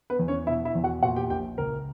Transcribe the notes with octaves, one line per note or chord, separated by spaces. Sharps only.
B3 B4
E2
C#4 C#5
B2 E4 E5
E4 E5
E2
F#4 F#5
A#2 F#4 F#5
G4 G5
A#1 G4 G5
C#2 A#4